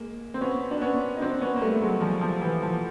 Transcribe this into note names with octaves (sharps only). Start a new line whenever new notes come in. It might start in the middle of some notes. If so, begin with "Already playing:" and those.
Already playing: G#3 A#3
C4
B3 C#4
D4
B3 C#4
D#4
C4 D4
B3 C#4
A#3
G3 A3
F#3 G#3
F3 G3
F3
E3
F3